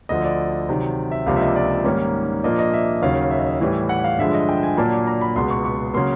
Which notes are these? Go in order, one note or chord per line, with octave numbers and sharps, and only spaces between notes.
D2 D3 F3 D#5
D5
C3 D#3 F#3
E5
C#2 C3 F3 A#3 D4 F5
E5
D#5
D5
G#2 D#3 G3 A#3 C#4
A#2 F3 A#3 D4 D#5
D#5
E5
D#2 C#3 F#3 F5
E5
D#5
E5
A2 E3 G3
F#5
F5
G2 D3 F3 G#3 E5
D#5
G5
G#5
A#2 F#3 A#3 D4 A5
A#5
B5
C#2 B2 G#3 B3 C6
C#6
C#6
C#3 F#3 A#3 C6